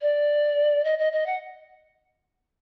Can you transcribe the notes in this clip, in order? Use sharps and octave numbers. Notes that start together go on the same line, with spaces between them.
D5
D#5
D#5
D#5
F#5